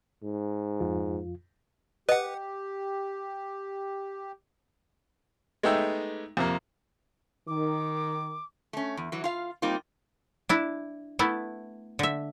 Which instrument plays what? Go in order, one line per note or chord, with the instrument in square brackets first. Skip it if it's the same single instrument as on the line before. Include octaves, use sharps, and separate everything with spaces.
[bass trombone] G#2
[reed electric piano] F2 F4
[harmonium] G4 [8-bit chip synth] B4 F#5 [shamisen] D#5
[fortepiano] G#3 A3 B3 D#4 G4 E5
F2 C3 A#3
[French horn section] D#3 [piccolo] D6
[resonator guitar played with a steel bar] A3 C#4
E2
E3 F#3
F4 F5
G3 A#3 C4 D#4 F4
[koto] D4 E4
A3 B3 E4
D3 E5